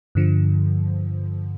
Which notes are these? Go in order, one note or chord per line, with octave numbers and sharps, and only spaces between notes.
G2 D3 F3